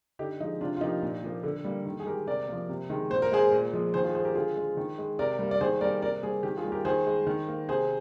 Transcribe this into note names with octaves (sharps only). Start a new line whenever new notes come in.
D3 D#4 G4
F3 G#3 D#4
C3 D4 F4
F4
F3 A#3 D#4 G4
A#2
F3 A#3
D3
G3 A#3
D#3
G#4
G#3 G4 A#4
C3 A#4 D5
F3 A#3
C3
D#3 G#3
A#2 C5
A#4
G#3 G#4 C5
A#2
F3 G#3
D#3 G#4 C5
F4 G#4
G#3 G#4 C5
G4 A#4
D3 F4 G#4
G#3
D#3
G#3
C3 A#4 D5
G3 A#3
D5
D#3 G#4 C5
G3 A#3 A#4 D5
C3 A#4 D5
G3 A#3 G#4 C5
D#3 G4 A#4
F4 G#4
G3 A#3
G4 A#4
D#3 G#4 C5
G#3
D#3
A#3
C3 G#4 C5